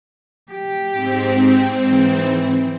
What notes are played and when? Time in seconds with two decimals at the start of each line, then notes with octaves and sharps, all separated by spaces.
0.52 G4
0.91 G#2 C4
1.89 E3